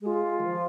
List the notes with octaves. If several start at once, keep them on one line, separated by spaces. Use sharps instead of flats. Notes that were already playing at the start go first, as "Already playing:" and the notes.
G#3 F4 G#4
D#3
F3